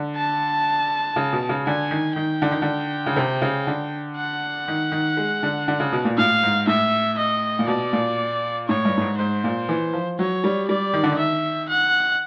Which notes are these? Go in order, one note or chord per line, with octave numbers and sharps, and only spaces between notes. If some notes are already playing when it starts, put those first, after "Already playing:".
Already playing: D3
A5
C#3
B2
C#3
D3 G#5
D#3
D#3 G5
D3
D#3
D3
C#3
C3
C#3
D3
F#5
D#3
D#3
G#3
D3
D3
C#3
B2
A#2
A2 F5
G#2
A2 E5
D#5
A#2
B2 D5
A#2
A2 C#5
G2
A2
G#2
G#2 C5
A#2
E3
F3
F#3 C#5
G3
G3 D5
D#3
D3
D#3
E5
F#5